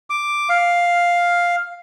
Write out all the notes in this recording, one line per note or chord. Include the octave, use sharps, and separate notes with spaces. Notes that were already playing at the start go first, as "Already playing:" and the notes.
D6
F5